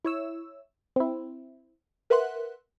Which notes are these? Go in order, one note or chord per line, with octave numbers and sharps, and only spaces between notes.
E4 C#5 E6
C4 E4
A#4 B4 E5 F#5 C6 F#6